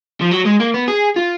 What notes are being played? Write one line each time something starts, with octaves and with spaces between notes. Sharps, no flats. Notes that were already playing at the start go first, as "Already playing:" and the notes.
F3
F#3
G#3
A#3
B3
G#4
F4